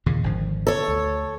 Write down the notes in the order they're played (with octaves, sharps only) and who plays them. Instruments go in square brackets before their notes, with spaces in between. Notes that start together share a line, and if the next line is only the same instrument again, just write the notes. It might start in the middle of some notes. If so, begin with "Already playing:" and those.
[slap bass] D#2 A#2 C#3
G#1 D3 F3
[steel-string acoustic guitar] A4 C#5
[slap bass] D2